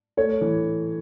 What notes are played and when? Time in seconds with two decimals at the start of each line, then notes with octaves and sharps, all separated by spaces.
0.17 A3 C#5
0.41 E3